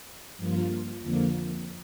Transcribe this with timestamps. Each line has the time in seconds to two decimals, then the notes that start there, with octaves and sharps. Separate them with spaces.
0.37 G2 F3 A#3 F4
1.00 F2 D3 F3 A#3